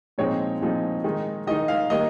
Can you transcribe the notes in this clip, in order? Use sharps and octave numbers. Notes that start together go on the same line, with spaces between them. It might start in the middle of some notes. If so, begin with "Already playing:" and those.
A#2 F3 G#3 C4 D#4 C#5
A#2 F3 G#3 C4 D#4
D#3 G#3 D#4
D#3 G#3 D#4 D#5
F5
D#3 G3 A#3 D#5